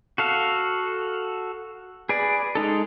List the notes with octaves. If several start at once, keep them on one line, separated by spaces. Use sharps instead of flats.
F#4 A4 F5
G#4 B4 D5
G#3 D#4 A4